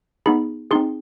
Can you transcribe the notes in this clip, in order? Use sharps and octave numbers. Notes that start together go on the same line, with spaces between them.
B3 D#4 G#4 B5
C4 D#4 G#4 C6